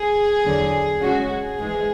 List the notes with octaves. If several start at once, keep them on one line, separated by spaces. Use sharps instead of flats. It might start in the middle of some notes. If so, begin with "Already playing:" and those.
Already playing: G#4
E2 D3 F#3
C#3 G#3 C#4 F#4
G#4
G#2 E3 G#3